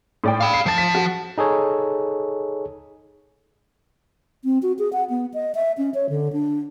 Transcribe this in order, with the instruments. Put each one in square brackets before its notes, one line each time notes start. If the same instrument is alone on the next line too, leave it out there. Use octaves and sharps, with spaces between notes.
[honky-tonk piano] A2 D5 G5
[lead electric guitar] F5 B5
[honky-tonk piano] C7
[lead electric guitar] F3 A5 [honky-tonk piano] A6 C7
[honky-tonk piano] B6
F#4
[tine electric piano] D#4 G#4 A4 C#5
[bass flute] C4
F#4
G#4
F#5
B3
D#5
E5
C#4
C#5
D3
D4